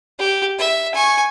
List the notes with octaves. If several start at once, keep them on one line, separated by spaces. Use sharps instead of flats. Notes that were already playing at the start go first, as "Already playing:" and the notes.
G4
E5
G#5 C#6